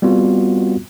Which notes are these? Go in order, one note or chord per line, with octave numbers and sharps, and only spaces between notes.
G3 B3 C4 F4 F#4